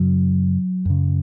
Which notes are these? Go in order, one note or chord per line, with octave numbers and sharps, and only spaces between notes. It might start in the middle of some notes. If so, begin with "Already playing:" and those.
Already playing: F#2 C#3 F#3
F#2 C#3